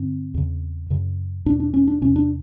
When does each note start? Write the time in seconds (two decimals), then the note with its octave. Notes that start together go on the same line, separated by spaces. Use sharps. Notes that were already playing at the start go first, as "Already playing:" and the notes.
Already playing: G2 D3 C4
0.34 E2 C#3
0.90 F#2 C#3
1.46 E2 B2 D4
1.60 D4
1.74 C#4
1.87 D4
2.01 E2 C3 C#4
2.16 D4